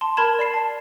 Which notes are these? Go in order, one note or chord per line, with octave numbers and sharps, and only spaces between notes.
A5 C6
A#4 A5 B5 G#6 E7
D5 B5 C7 E7
A5